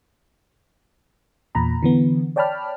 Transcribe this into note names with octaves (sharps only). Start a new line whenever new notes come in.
E2 A#2 A#5 B5
D3 E3 B3
C#5 D5 G5 A5 B5 F6